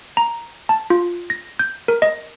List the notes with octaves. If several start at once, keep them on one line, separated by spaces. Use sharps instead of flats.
A#5
A5
F4
A#6
G6
A#4
D#5